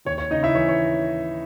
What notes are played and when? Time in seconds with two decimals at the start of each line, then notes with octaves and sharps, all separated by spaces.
0.05 D#2 C#5
0.18 C#5
0.31 C#3 D#4 D#5
0.43 E4 E5
0.55 E3 C#5
0.69 C#5